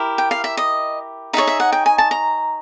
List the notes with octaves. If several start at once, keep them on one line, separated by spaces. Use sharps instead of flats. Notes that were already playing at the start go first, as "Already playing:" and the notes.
Already playing: E4 G4 A#4
G5
F5
E5
D#5
D#4 G#4 C#5 E5
E5
F#5
G5
G#5
A5
A#5